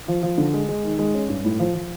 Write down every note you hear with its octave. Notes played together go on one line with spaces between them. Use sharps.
F3
F3
D3
G#3
G#3
D#3
G#3
C#4
G2
A2
F3
F3